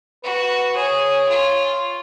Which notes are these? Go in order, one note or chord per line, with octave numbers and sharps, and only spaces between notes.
F#4 B4
G#4 C#5
F4